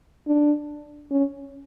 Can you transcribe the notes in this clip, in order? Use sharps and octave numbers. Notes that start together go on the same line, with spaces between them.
D4
C#4